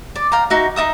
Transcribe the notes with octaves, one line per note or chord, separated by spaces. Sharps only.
D5
F5 G5 A#5
D#4 F#4 E5
D#4 D#5 E5 D#6